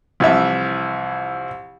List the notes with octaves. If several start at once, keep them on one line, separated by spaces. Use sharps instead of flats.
C2 E3 F3 E5